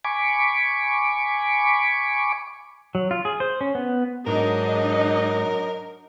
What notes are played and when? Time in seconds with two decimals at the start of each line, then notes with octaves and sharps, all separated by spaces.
0.05 G#5 B5 C#6 D6
2.95 F#3
3.11 F4
3.25 G#4
3.40 C5
3.61 C#4
3.75 B3
4.27 G#2 F#3 D4 D#4 A#4 D#5